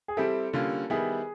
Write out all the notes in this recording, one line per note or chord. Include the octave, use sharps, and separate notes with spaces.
G#4
G3 C4 E4 G4 A4
D3 G3 A#3 C#4 F4
D#3 G3 B3 E4 G#4